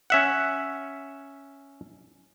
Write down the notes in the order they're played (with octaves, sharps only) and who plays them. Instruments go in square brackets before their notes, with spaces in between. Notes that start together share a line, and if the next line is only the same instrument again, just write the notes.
[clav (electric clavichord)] C#4 E5 F#5